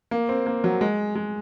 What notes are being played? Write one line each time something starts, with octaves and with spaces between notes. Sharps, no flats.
A#3
C4
A#3
F#3
G#3
G#3